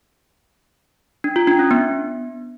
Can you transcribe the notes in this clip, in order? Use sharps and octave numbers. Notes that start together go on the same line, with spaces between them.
D4
F4
D4
C#4
B3